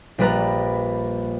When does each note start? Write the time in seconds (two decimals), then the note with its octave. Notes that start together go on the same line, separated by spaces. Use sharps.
0.18 A#1 G3 B4 A#5